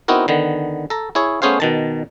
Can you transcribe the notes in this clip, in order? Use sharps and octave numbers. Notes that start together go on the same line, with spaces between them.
B3 C4 D#4 E4 F#4 A#4
D3 D#3 B3
A4 A#5
E4 G#4 C#5
A3 B3 C#4 G#4 C5 F5
B2 D#3 A5